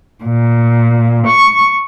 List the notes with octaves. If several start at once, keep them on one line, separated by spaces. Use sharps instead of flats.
A#2
C#6